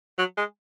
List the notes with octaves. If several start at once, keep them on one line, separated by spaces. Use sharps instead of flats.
F#3
G#3